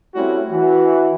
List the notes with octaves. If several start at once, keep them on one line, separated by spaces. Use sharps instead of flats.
G3 A3 C4 C#4 E4 F#4
E3 F#4